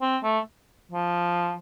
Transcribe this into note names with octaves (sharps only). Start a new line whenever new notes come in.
C4
A3
F3